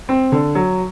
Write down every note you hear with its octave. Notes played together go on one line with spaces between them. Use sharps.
C4
D3
F#3